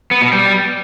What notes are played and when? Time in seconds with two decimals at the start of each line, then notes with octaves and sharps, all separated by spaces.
0.11 B3
0.22 B2
0.32 G3